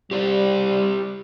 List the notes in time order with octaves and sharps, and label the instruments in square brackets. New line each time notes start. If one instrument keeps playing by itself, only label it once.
[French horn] G3 [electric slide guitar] G4 C5 D5